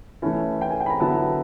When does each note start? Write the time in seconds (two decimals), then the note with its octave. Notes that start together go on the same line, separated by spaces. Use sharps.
0.22 E3 A3 C#4 E4
0.61 G5
0.70 G#5
0.80 G5
0.86 B5
0.90 A#5
1.00 D3 F#3 B3 E4 A5